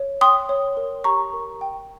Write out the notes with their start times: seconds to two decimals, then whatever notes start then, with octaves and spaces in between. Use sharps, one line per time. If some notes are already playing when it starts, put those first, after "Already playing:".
Already playing: C#5
0.21 G5 C6 D#6
0.49 C#5
0.77 A#4
1.04 G4 A#5 C#6
1.33 A#4
1.61 G5